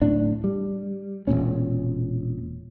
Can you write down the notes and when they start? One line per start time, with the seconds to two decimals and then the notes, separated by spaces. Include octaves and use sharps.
0.02 D1 A2 D4
0.44 G3
1.27 E1 A#1 A#2 C#4